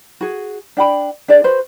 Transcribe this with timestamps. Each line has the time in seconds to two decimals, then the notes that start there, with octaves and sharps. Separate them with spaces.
0.21 F#4 G#4
0.77 D4 G5 B5
1.28 D4 G#4 D5
1.44 F#4 B4 C5